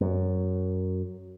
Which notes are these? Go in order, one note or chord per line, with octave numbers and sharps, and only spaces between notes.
F#2